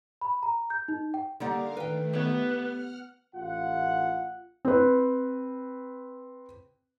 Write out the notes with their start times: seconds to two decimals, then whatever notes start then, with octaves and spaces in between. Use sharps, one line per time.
0.21 B5
0.43 A#5
0.70 G6
0.88 D#4
1.14 G5
1.40 D3 G3 A#3 D#4 A#4 D5 F5 F#5
1.77 D#3 A3 B4 G5
2.13 B3 G4 C#5
2.59 F#5 F6
3.35 A1 F4 F#5
4.65 C4 B4